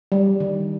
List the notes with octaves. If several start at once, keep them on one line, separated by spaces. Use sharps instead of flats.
G3
D#3